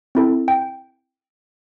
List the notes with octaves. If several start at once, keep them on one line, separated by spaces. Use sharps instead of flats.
C4 E4 A4
G5